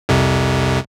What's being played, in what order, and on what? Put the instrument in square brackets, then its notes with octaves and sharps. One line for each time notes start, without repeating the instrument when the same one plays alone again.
[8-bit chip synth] C2 F2 C3